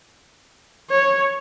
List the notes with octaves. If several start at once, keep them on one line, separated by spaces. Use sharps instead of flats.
C#5